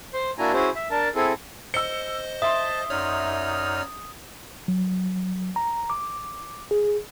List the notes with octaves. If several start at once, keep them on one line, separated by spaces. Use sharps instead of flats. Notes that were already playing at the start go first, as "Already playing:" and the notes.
C5 C6
A#3 D4 E4 F#4 G#5 A#5
C#4 E4 F#4 G#4 C5
E5
D4 A#4 A5
C4 E4 G#4 A4
C5 D#5 E6 C#7 G7
E5 A5 C6 D#6
F#2 D#4 C#5 D5 F6
F#3
A#5
D6
G#4